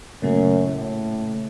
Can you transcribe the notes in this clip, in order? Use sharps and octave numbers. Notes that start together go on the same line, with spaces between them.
F#2 A#2 C#3 A3
A2